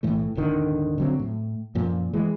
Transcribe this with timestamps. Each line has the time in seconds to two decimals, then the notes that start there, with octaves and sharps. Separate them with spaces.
0.03 B1 A2 E3 A3
0.35 D#1 G#1 D3 D#3
0.98 D3 F#3 C4
1.19 A2
1.75 F#2 A#2 F3
2.13 E3 G#3